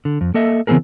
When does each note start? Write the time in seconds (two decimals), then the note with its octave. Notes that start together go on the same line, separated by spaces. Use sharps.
0.05 D3
0.21 F2
0.34 A#3 A4 D#5 E5
0.67 C#3 E3 B3 C4 G#4 A#4